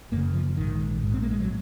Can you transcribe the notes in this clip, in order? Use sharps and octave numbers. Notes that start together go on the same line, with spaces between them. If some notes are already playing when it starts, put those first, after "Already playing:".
F#1 F#2 C#3 A#3
F3
A#1 G#2 D#3
A#1 G#2
C4
A#3
G#3
F#3